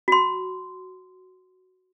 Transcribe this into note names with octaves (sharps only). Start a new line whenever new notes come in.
F#4 C6